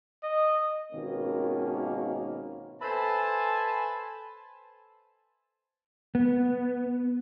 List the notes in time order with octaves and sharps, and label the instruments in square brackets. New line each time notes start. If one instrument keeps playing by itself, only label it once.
[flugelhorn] D#5
[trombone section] G#1 B2 D#3 A#3 C#4
[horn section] A4 B4 C5 E5 G#5 A5
[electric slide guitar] B3